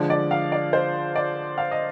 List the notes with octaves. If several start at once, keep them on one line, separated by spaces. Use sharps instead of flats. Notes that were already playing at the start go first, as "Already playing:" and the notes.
Already playing: D3 F3 G#3 D5
D5
F5
D5
C5
D5
F5
D#5